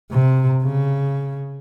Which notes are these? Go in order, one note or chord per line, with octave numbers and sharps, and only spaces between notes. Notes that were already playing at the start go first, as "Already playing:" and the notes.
C3
C#3